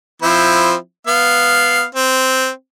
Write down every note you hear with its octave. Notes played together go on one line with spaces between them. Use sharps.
F3 C4 E4
B3 F5
C4